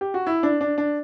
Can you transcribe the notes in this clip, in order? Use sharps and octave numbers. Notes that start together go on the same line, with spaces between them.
G4
F#4
E4
D4
D4
D4